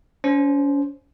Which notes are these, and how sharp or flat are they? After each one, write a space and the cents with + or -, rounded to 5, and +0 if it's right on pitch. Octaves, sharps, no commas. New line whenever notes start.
C#4 +35 C5 +0